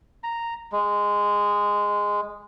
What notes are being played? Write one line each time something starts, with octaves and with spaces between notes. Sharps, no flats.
A#5
G#3